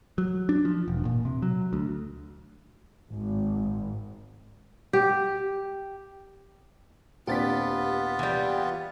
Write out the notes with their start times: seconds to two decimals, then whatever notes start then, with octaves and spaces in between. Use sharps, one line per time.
0.18 F#3
0.49 D4
0.65 F3
0.88 E1
1.05 A#2
1.25 C3
1.42 F#3
1.73 D2
3.12 G#1
4.93 G4
7.27 D#1 B3 C4 D4 F4 G4 A6 B6
8.19 E3 G3